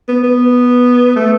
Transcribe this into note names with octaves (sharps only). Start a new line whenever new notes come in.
B3
B3
A3